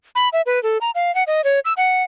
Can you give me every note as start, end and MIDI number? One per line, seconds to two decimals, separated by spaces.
0.15 0.29 83
0.33 0.42 76
0.46 0.62 71
0.63 0.78 69
0.81 0.91 82
0.95 1.14 77
1.15 1.24 78
1.27 1.44 75
1.44 1.60 73
1.65 1.73 88
1.77 2.03 78